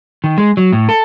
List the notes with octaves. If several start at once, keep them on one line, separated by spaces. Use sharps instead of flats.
D#3
G#3
F#3
A2
A4